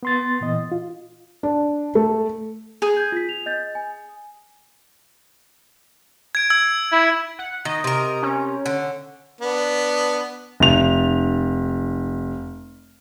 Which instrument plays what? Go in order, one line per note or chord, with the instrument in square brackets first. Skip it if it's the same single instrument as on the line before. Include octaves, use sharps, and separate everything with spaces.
[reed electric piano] B3 C6 A6
A#2 E3 D#5
F4
[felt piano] D4
A3
[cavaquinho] G#4
[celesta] G6 G#6
F4 B6
F7
D#5 G6 A6
G#5
[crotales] G#6 D7
E6 G#6
[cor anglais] E4
[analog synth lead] F#5
[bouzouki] D#3 [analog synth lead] D#5
[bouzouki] C3 A#4
[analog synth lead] C#4
[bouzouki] D3
[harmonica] B3 D4
[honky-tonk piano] F1 F7